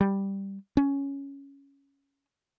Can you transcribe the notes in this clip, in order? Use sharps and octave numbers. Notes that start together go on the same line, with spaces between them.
G3
C#4